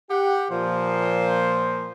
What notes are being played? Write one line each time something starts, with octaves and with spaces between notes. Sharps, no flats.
G4 F#5
A#2 F3 C5